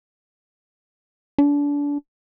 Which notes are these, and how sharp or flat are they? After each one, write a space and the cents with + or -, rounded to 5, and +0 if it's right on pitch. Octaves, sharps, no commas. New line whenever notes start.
D4 -30